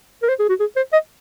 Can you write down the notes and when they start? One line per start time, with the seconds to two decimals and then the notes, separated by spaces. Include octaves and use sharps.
0.22 A#4
0.29 C5
0.40 G#4
0.49 F#4
0.60 G#4
0.77 C5
0.93 D#5